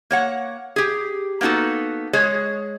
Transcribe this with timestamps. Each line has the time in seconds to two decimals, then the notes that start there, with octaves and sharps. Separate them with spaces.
0.11 A#3 C#5 F#5
0.76 G4 G#4
1.41 A#3 B3 D#4 F#4 A4
2.13 G#3 G#4 C#5